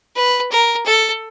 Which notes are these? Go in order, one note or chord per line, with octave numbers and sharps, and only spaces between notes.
B4
A#4
A4